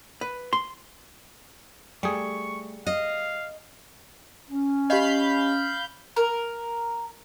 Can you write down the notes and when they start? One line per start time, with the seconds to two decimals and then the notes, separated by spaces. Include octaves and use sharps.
0.21 B4
0.53 C6
2.03 G3 A3 G#4 C#6
2.87 D#5 F5
4.50 C#4
4.90 G4 D#5 F5 B5 G6
6.16 A#4